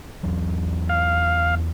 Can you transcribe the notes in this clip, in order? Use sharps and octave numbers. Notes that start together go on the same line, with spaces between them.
E2 F#3
F5